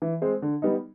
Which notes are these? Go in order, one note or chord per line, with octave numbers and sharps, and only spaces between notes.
E3
G#3 C4
D3
G3 B3 D#4